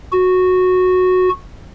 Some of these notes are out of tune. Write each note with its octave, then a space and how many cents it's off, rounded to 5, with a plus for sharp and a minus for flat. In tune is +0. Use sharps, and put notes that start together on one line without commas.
F#4 -10